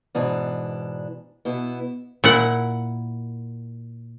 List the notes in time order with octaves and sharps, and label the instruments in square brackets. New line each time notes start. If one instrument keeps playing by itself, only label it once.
[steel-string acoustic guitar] G#2 B2 E3 D4
B2 B3 E4
[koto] A#2 E4 F#5